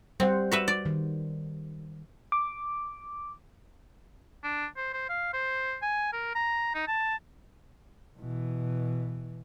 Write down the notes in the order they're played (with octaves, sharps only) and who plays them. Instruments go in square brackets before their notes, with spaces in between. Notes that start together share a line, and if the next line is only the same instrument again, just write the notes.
[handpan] G3 C5 F#5 [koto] C4
[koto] F#4 B4 E5
D5
[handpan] D#3
[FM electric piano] D6
[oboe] D4
C5
C5
F5
C5
G#5
A#4
A#5
D#4
A5
[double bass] B2 E3